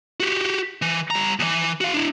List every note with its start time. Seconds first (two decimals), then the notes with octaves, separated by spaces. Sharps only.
0.20 F#4 G4
0.82 E3
1.10 G3 A#5
1.39 D#2 E3
1.81 F#4 F5
1.94 D4 E4